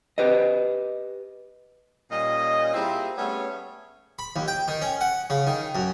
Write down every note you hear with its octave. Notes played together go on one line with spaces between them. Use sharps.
G4 B4 D#5
A#2 G3 C#4 D#5
G3 A#3 C4 E4 F4 G#4
G3 A3 B3 C#4 G#4 C#5
B5
D#2
G5
D#3
C#4
F#5
C#3
D#3
F#2